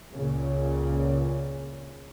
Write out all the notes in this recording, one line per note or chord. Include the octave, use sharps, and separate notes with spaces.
C#2 A#2 C#3